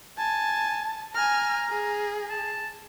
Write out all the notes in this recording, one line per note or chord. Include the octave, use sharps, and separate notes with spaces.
G#5 A5
G#5 A#5 F6
G#4
A5